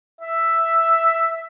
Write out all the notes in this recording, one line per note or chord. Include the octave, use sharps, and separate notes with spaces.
E5